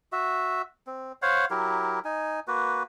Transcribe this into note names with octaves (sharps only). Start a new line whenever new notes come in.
F#4 E5
C4
C5 C#5 F5 F#5
F#3 E4 G4 A#4
D#4 G#5
A#3 F#4 B4